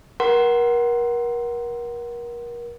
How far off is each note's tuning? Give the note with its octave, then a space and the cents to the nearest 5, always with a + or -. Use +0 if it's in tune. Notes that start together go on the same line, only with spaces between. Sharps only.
A#4 +35 F#5 +20 C6 +0